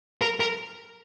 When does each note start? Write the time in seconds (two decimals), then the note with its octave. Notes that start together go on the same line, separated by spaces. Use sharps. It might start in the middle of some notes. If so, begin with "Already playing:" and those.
0.22 A#4
0.40 A#4